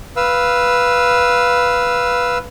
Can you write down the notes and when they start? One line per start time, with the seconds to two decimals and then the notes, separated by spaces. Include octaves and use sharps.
0.16 B4 F5 E6